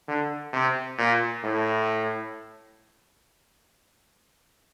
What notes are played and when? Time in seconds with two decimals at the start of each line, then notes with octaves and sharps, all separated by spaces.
0.08 D3
0.53 C3
0.98 A#2
1.43 A2